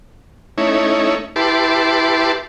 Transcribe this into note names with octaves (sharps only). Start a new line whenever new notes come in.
A3 C#4 D#4 E4 C#5
E4 G4 B4 A5 C6 D6